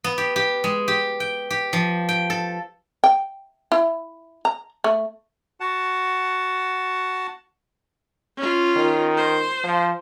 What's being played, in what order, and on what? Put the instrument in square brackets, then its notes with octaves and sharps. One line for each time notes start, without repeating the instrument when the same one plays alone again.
[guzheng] B3
G4
G4
G#3
G4
G5
G4
F3
G5
A4
[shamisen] G5
E4
A#5
A3
[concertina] F#4 F#5 A5
[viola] C#4 F4
[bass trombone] D#3
[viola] C5
[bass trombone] F3